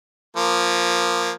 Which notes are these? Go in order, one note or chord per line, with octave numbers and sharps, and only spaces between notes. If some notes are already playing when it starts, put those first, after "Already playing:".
F3 A#3